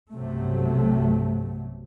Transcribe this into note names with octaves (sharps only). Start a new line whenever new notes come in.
B1 G2 C3 F#3 A3